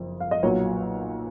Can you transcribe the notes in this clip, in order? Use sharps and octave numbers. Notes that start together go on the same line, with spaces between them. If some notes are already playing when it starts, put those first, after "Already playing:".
Already playing: F#1 F2
F5
D#5
B1 A#2 F#3 C#5